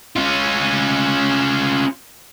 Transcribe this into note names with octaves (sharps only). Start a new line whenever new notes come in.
C#4 F4